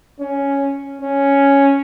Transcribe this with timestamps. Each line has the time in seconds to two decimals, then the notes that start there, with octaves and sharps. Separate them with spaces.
0.20 C#4
1.01 C#4